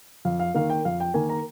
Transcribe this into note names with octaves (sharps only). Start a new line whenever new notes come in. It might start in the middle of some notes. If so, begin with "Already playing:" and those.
F2 F5
F5
D#3 A#3 F5
G5
F2 F5
G5
D#3 A#3 G#5
A#5